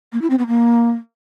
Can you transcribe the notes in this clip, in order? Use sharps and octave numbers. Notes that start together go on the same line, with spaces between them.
A#3
E4
C4
B3
A#3